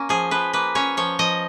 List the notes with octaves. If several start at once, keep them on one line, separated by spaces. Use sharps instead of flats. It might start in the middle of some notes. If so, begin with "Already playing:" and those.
Already playing: A#3 C#4
F3 G#4
F3 B4
A#3 B4
C#4 C#5
F3 C#5
F3 D#5